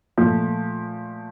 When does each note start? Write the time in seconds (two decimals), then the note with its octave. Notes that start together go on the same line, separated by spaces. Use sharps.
0.18 A#2 F3 A3